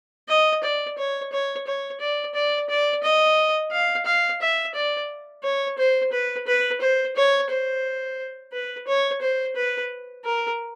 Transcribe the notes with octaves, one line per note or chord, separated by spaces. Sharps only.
D#5
D5
C#5
C#5
C#5
D5
D5
D5
D#5
F5
F5
E5
D5
C#5
C5
B4
B4
C5
C#5
C5
B4
C#5
C5
B4
A#4